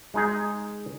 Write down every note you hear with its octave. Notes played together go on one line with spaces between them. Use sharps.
G#3 D#4 G#4